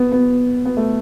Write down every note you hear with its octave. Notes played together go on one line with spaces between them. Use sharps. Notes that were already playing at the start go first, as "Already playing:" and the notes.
Already playing: B3
B3
B3
A3